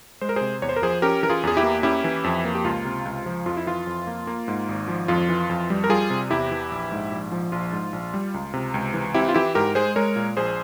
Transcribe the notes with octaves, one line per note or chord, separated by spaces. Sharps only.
G#3 C5
A#4
C3 G#4 C5
E2 C#5
C5
A#4
F3 G#4 C5
C#4 G4 A#4
E3 A#4
F4 G#4
E2 G#4
E4 G4
A#3
C#4 E4 G4
E3
F2
A#3
G4
C#2 F4
C3
C#2
F3
F2 F4
E4
E3 F4
F2
A#3
A#3
G#2
G#1
F3
F2 F4
E3
F2
G3
A#4
G3 F4 G#4
C3
E2 E4 G4
E3
A#1
G#2
A#1
F3
A#1 F4
G#2
A#1
G3
C#2
C3
C#2
E3
C4 E4 G4
F4
E3 E4 G4
G#2 G4 A#4
G#3 G#4 C5
G#3 A#4 C#5
A#2
A#1 G#4 C5